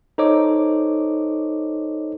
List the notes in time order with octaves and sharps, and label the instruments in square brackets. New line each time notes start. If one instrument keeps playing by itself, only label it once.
[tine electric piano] D#4 A4 C5 C#5 D#5 D6